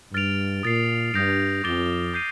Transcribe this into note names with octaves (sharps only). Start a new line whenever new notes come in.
G2 F6 A6 D7 F7
A#2 D#6 A6 C7
G2 D#6 G6 A#6 D7 F7
F2 D6 A6 D7 G7
D#6 G6 C7 D#7